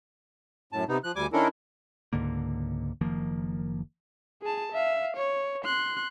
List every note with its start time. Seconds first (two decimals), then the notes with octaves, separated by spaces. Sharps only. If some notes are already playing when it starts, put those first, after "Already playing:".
0.73 F#2 A2 A5
0.88 C3 B3 D#4
1.04 F3 F#6
1.16 D2 G3 G#5 D6
1.33 D#3 C#4 D4 E4 A4 A#4
2.13 C#2 G#2 D3 A#3
3.01 F#1 D#3 F3 A#3
4.42 G#4 A5
4.72 E5 F5
5.17 C#5
5.65 C6 F#6